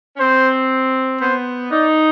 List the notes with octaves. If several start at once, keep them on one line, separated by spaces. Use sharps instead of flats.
C#4
C4 C5
B3 C5
D#4 D5